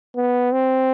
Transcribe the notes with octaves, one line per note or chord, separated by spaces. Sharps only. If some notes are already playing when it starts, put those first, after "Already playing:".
B3
C4